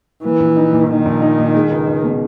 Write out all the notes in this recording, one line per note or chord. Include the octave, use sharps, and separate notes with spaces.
E3 A#3
A#1
D#4
A#2
D#3 A#3
A#1
D#4
A#2
G#3
C#2
C#2
B2